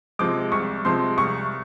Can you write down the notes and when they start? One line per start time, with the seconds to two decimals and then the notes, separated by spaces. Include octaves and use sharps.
0.19 C3 F3 G#3 D6
0.52 C2 C#6
0.85 C3 F3 G#3 C6
1.18 C2 C#6